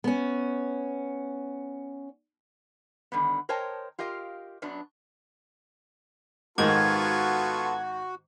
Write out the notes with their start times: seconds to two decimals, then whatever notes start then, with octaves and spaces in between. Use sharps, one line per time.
0.04 B3 C#4
3.12 D3 D#3 G3 B3
3.49 A#4 C5 C#5 D#5 G5 A5
3.99 F4 G4 A#4 D#5 F5
4.62 F#2 F#3 B3 D4
6.58 G#2 D#3 B3 F4 F#4 A4 G#6